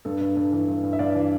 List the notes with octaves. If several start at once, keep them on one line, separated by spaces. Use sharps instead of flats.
G2 A4
G2
G2
E3
G2
G2
E5
G2 D5 F5
E3